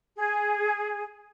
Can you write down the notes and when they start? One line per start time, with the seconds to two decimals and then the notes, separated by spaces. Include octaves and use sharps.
0.17 G#4